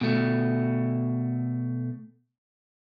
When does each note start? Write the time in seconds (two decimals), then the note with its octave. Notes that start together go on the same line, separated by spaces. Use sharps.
0.01 B2 A3